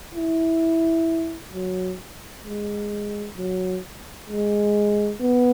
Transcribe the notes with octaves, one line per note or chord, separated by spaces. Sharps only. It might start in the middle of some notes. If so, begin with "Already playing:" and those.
E4
F#3
G#3
F#3
G#3
B3